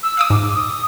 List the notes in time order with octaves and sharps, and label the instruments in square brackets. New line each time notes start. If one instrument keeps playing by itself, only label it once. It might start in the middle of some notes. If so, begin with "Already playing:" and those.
[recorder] E6
[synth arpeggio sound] F5 D6 D#6
[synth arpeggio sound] G#2 [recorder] D6
[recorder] D#6